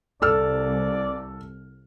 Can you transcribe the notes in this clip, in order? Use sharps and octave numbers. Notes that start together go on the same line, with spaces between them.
C2 A4 D5 E6 F6